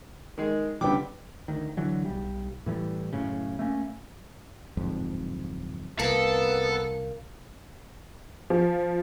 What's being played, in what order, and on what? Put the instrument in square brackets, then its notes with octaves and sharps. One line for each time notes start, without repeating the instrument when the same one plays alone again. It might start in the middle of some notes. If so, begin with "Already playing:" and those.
[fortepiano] D#3 G#3
[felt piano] C#2 D3 G3 [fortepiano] B3 G5 D6
[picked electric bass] D2 D#3
D3 E3 F#3
B1 G3
A2 E3 F#3 G3
F#1 A2 C#3
A3 A#3 C#4
[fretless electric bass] D1 F2 G#2
[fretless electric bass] C2 [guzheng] A#3 [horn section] B3 [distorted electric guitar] A4
[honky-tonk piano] F3